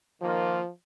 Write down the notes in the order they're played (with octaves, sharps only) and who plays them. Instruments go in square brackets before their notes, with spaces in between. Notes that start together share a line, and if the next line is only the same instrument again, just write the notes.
[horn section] D#3 A#3 F4 [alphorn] F3